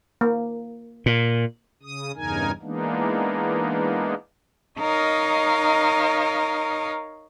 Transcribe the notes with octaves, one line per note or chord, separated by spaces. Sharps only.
A#3
A#2
C#3 D#6
E2 G2 C#3 D#4 A#4 G#5
E3 G#3 A#3 B3 D4 D#4
D#4 A#4 C#5 D#5 F5